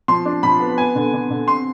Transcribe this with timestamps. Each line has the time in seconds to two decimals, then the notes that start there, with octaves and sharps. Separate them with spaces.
0.08 F3 C6
0.25 D4
0.43 F3 B5
0.60 B3
0.78 B3 G#5
0.95 D3
1.13 D3
1.30 D3
1.48 C4 C6